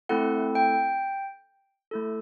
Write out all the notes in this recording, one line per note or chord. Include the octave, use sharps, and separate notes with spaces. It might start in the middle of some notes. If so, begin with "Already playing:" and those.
A3 C4 E4 A4 F#5
G5
A3 E4 A4